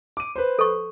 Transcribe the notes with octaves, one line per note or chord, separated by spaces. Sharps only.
D6 D#7
B4 C5
A4 C#6